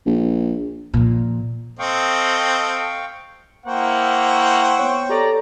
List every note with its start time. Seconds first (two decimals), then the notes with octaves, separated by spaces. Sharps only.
0.06 A#1
0.94 A#2 F3
1.79 C4 A4 D#5 F5 G5 C#6
3.65 A#3 E4 C5 F#5 G5 C#6
4.77 B3 C#5 D7
5.09 G4 A4 C#5 D5 A#5